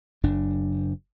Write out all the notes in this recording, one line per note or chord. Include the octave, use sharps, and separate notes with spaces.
F#1 F#2 D4